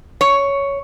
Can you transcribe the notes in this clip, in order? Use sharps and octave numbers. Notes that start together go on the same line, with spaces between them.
C#5